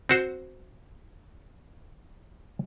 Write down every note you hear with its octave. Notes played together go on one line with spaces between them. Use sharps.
C4 F#4 C5